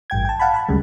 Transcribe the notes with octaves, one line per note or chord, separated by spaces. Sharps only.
A1 G2 G5 G#6
G5 A5
F5 F#5 A5 B5
A5 B5
D2 C#3 G3 G#3